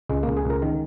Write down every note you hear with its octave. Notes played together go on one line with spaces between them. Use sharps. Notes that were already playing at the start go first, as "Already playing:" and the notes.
C#2 G#3
C#2 A#3
G#4
C#2 A#4
D#3